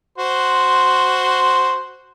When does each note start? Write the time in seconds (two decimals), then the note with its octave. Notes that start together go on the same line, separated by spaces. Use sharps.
0.18 F#4 C5 C6